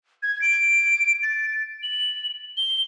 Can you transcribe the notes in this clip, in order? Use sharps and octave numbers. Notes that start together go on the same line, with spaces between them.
G#6
D7
A6
F#7
G7